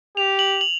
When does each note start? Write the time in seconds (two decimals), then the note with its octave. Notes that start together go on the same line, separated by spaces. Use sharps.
0.17 G4 F7
0.39 F#7
0.61 F#7